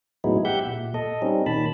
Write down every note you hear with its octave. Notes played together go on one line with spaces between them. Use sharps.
A2 F#3 G#3 B3 D#4 E4
G4 E5 F#5 G6
A#2
A4 D#5
G3 C4 C#4 D#4
A#2 D#3 A5 B5